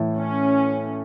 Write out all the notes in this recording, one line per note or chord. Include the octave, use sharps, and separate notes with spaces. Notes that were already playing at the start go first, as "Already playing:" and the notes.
Already playing: A2 E3 A3 E4 A4
C#4